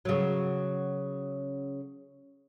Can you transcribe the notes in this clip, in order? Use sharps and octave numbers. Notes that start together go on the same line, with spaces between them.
C#3 F#3